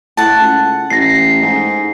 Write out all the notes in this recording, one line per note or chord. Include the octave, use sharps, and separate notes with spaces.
A2 F#5 A5
C#2
A1 A#6 C7
G#2